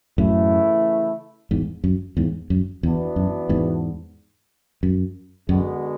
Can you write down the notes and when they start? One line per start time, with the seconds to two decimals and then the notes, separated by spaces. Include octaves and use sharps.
0.18 F#2 A2 C#3 E3 A3 E4
1.51 E2 G#2
1.84 F#2
2.17 E2 G#2
2.50 F#2
2.83 E2 E3 B3 D4 F#4
3.16 F#2
3.49 E2 G#2
4.83 F#2
5.49 F#2 D3 G#3 B3 D4 F#4